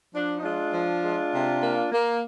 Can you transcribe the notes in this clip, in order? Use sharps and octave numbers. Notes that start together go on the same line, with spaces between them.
F3 D4
D#4
G#3 D4 F4
F3
G#3
C3
A#3
A#3